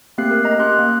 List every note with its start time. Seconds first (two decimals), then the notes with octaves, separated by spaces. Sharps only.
0.18 A3 A#3 C4 G4 F#6 C7
0.31 A#4
0.43 A#4 D#5 A#5
0.59 C#4 G4 C6 F#6
0.79 A#3